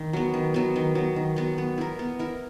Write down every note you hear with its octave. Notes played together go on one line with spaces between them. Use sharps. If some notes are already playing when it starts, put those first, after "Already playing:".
Already playing: D#3
F#3 B3
D#3
F#3 B3
D#3
F#3 B3
D#3
F#3 B3
B3
E4 A#4
B3
E4 A#4